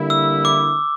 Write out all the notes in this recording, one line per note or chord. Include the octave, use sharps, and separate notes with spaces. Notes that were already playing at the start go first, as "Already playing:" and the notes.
Already playing: D3 G3 A#3 E4
E6
D6